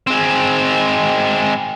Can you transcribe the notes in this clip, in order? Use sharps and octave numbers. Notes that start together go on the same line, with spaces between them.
G#3 C4